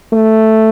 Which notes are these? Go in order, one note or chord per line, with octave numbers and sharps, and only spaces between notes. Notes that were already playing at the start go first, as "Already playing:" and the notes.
A3